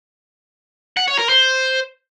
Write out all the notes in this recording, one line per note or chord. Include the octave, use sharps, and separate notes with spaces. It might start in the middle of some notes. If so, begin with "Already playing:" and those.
F#5
C#5
A#4
C5